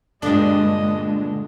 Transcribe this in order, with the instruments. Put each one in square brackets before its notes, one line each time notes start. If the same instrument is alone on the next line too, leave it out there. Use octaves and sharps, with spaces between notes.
[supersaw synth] G2 D4 [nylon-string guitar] A#2 D3 [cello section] G#3 [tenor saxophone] D#5